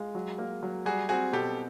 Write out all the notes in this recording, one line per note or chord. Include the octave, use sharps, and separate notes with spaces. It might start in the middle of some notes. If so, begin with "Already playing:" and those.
Already playing: G#3 F4
F#3
A#3
F#3
G3 F#4 G#4
C4 F#4 G#4
B2 G4 A4